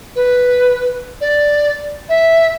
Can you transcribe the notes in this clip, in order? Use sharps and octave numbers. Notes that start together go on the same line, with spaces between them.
B4
D5
E5